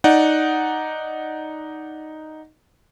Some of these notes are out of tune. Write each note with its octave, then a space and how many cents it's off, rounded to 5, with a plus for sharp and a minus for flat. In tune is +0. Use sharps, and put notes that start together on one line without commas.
D#4 +0 D5 +0 F#5 +0